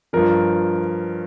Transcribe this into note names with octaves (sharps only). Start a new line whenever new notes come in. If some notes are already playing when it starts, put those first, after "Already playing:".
G2 F3 A#4